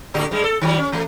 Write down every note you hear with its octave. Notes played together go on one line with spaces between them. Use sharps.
A2 D3 G4
G2 G3 G#3
A4
D#3 F#3 G3
C#4
E3 A3